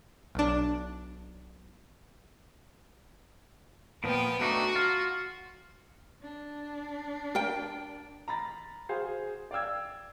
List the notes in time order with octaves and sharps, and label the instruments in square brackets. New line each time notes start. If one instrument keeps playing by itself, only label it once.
[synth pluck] B1 D4
[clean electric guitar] A#2 F3 [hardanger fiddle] B3 G5
[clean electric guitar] A3 D4 D#4 [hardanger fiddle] F#4
[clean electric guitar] F4
[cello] D4
[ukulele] A#4 G5
[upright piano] A#5 B5 A6
F#4 G#4 C5 F5
D5 F5 G5 E6 G#6